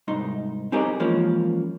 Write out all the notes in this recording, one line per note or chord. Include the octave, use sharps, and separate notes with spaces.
C2 G#2 D#4 C6
C4 D#4 G4 G#4 A#4 D#5
E3 F3 G#3 A#3 C#4